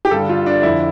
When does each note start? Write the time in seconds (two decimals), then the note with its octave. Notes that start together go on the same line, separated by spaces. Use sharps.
0.05 G4
0.11 G2 D3 A4
0.29 F4
0.46 D4
0.63 F2 D3 E4